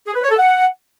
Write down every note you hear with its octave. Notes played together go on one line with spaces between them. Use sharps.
G#4
B4
C#5
A4
F#5